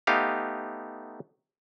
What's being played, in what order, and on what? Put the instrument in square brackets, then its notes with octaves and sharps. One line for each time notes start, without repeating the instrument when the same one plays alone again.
[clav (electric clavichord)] A3 B3 D#4 G4 F5